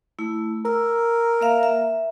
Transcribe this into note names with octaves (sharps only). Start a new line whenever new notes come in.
A3 E4
A#4 E6
A#3 E5 F5
E5